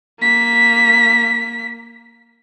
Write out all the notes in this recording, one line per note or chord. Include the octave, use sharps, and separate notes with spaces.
A#3 B6